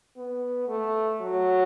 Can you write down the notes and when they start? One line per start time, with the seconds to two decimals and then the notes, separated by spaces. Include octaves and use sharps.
0.17 B3
0.68 A3
1.21 F#3